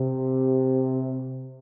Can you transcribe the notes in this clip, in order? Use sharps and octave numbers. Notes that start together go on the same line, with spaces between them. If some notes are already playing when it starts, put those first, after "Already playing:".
Already playing: C3